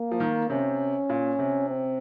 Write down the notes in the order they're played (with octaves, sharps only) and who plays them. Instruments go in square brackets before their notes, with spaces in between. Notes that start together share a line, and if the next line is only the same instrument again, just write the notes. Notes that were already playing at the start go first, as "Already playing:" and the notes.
Already playing: [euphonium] A#3
[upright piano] F3
D#3
[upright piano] C3 [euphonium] C#4
[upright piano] A#2
C3
[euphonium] C4